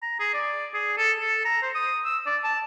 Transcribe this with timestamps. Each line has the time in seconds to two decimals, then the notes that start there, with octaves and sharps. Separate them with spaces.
0.03 A#5
0.20 G#4
0.34 D5
0.74 G#4
0.98 A4
1.21 A4
1.45 A#5
1.62 C5
1.75 D#6
2.05 E6
2.26 D5
2.44 A5